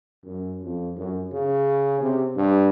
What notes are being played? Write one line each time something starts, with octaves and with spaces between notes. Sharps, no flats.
F#2
F2
F#2
C#3
C3
G2